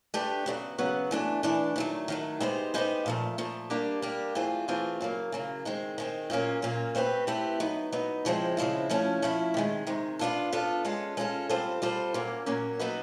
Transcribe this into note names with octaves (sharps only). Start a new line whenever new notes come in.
A3 D4 G4 B4
C#3 F#3 B3
C#3 F#3 B3
E3 A3 D4
E3 A3 D4
D#3 F#3 A3
D#3 F#3 A3
G#3 B3 D#4 G4 C5
G#3 B3 D#4 G4 C5
A#2 F3 A3
A#2 F3 A3
G3 A#3 D4 G4
G3 A#3 D4 G4
E3 A3 C4 F4 G#4
E3 A3 C4 F4 G#4
C#3 F#3 A#3
C#3 F#3 A#3
D#3 G#3 C4
D#3 G#3 C4
A#2 F#3 A#3 C#4 F4
A#2 F#3 A#3 C#4 F4
A3 C4 E4 G4 B4
A3 C4 E4 G4 B4
F#3 B3 D#4
F#3 B3 D#4
C#3 F3 G#3 C4 E4
C#3 F3 G#3 C4 E4
F3 A3 C#4 E4
F3 A3 C#4 E4
C3 D#3 G#3
C3 D#3 G#3
B3 D4 F4 A4
B3 D4 F4 A4
G#3 C#4 F4 A4
G#3 C#4 F4 A4
G3 C4 F4 A4 C5
G3 C4 F4 A4 C5
A#2 F#3 A#3 C#4
A#2 F#3 A#3 C#4
F#3 B3 D#4 F#4 B4